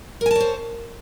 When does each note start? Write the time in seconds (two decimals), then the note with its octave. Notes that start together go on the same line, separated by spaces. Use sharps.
0.21 A#4
0.26 G#5
0.31 A5
0.36 C#5
0.40 C5